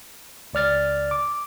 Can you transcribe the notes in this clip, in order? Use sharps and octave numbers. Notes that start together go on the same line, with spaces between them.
C#2 D5 F6 A6
D6